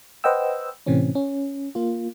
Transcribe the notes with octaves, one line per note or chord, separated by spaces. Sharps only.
B4 C5 D#5 F#5 G5 E6
A2 C3 E3 C4 C#4
C#4
A#3 F4